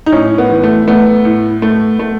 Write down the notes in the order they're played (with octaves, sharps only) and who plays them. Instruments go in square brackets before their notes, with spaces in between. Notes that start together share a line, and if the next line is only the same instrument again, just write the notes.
[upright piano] D#4
A2 C#4
B3
E3
A3
A3 B3
A2
A3
A3